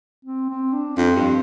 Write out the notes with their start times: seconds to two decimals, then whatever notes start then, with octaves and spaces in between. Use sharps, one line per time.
0.25 C4
0.49 C4
0.73 D4
0.97 F2 C4
1.15 G2